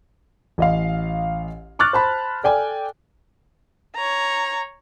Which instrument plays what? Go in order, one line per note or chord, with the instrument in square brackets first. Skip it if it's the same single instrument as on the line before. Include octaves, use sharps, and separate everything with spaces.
[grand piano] A1 D#5 F5
C#6 D6 F6 F#6 A6
C5 A5 B5
A4 D5 G5 G#5
[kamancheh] C#5 A#5